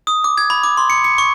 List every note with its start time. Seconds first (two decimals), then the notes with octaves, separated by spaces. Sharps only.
0.07 D#6
0.24 D6
0.38 G#6
0.50 B5
0.64 D6
0.77 C6
0.90 C#7
1.04 C#7
1.18 C#6